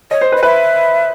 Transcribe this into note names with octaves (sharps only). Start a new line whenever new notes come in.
C#5 D#5
C5
B4
D#5
B4 E5